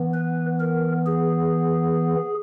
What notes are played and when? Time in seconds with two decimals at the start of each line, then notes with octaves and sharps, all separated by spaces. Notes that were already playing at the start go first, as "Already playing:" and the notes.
Already playing: E3 B3
0.14 B4
0.60 A#4
1.06 G#4